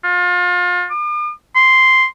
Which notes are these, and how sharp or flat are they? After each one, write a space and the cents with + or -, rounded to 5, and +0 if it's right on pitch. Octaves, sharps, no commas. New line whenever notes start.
F4 +35
D6 +45
C6 -5